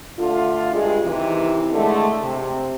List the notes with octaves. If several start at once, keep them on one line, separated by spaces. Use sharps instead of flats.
D3 A3 F4
G2 G#3
C3 D#3 E3
D3 G#3 A3
C3